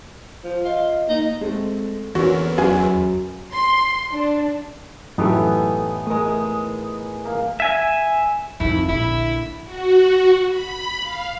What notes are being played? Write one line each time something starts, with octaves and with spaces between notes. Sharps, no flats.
F3
F4 D#5
A#3 D#4
G#3 A3 C4
E2 D3 A#3 C#4 F#4
F#2 G#4 B4 G#5
C6
D4
F#2 A2 E3 B3 D#4 G4 A4 G#5
G#3 A3 A#4 D#6
A#3
E5 G#5
F2 D#3 E4
A#1 D3 E4
F#4
B5
F5